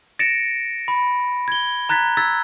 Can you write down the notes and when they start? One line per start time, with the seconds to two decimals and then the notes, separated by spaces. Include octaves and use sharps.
0.19 A6 A#6 C#7 D7 E7
0.88 B5
1.48 G#6 G7
1.89 A#5 F#6 G#6 A6 B6
2.17 E6 G#6 A6 B6